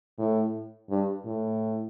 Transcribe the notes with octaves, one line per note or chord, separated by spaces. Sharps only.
A2
G2
A2